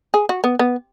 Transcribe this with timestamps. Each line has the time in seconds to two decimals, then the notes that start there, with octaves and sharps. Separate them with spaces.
0.14 G#4
0.29 F#4
0.44 B3
0.59 B3